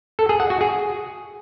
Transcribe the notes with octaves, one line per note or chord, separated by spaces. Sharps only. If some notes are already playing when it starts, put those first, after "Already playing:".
A4
G#4
F#5
F#4
G#4